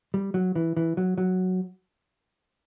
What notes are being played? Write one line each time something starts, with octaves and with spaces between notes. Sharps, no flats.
G3
F#3
E3
E3
F#3
F#3